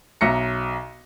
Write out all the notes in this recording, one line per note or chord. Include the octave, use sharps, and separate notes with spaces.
B1 E5 A#5 A#6 C#7